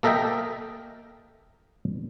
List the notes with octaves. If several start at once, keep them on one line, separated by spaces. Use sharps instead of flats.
A#3 A4 A#4 D#5 E5 G5